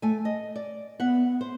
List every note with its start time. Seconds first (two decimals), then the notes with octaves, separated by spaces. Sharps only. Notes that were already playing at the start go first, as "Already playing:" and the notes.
0.02 A3 G#5
0.25 D#5
0.56 D5
1.00 B3 E5 F#5
1.41 C5